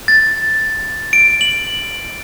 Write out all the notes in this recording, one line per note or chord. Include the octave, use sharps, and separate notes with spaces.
A6
D7
F#7